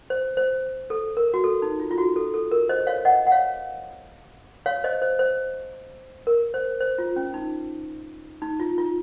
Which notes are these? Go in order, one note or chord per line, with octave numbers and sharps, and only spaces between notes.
C5
C5
A4
A#4
F#4
A4
D#4
F4
F4
F#4
A4
A4
A#4
C5 D#5
C#5 F5
D#5 F#5
F#5
C#5 F5
C#5 F5
C5 D#5
C5
C5
A#4
C5
C5
F4
C#4
D#4
D#4
F4
F4